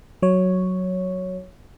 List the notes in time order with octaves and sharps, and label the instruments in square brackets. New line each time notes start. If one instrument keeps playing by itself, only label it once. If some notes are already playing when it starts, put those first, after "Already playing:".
[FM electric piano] F#3 C#5